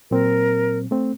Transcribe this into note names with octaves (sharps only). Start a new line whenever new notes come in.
A#2 F#3 C4 A#4
A3 C4